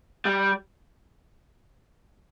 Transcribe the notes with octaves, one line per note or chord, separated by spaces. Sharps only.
G3